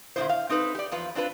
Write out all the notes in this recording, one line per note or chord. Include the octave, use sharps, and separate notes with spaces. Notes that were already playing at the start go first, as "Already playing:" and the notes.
A#2 D3 E3 D#4 E4 C5
F5
C4 D#4 A4 B4
G4 D5
E2 F3 F4 B4
C4 D4 F4 B4